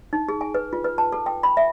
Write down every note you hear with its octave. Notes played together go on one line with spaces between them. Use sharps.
D#4
G#4
G#5
B4
F4
B4
A5
A4
G5
B5
E5